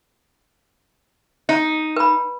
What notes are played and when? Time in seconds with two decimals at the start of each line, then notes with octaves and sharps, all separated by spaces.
1.49 D#4
1.96 B4 B5